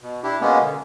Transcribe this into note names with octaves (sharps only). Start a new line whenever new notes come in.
B2
D4 E4 G4
B2 G#3 A#3 B3 C#4
D3